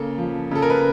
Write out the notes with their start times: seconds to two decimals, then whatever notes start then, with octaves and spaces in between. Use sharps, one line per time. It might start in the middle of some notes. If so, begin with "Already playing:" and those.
Already playing: C#3 A#3 A4
0.18 F3
0.51 C#3 A4
0.62 A#4
0.70 B4